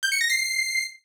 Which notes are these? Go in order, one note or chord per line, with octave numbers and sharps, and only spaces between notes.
G6
C#7
A#6
C7